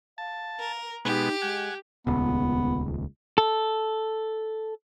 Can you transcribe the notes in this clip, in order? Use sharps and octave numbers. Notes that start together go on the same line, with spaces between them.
F5 A5
A#4
B2 G#3 B3 D#4 G4
G#3 F#5 G#5
D#1 C#2 B3
A4